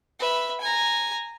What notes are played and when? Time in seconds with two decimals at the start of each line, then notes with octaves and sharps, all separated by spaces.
0.19 B4 E5
0.61 G#5 A#5